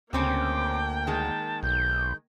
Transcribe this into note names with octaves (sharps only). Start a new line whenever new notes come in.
D2 C#3 A#3 C4 C#4 G5 D6
D#3 G#3 A5
B1 G6